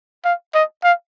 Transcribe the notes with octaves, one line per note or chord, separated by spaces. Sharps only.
F5
D#5
F5